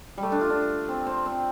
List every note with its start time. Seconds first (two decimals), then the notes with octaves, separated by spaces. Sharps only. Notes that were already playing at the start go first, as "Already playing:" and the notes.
0.18 G3
0.23 A3
0.32 D4
0.41 F4
0.50 D4
0.88 C4
1.07 C4
1.26 C4